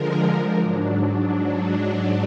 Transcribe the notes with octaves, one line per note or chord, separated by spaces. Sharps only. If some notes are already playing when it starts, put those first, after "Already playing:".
Already playing: D3 F3 G#3 A#4
G#2 F#3 D4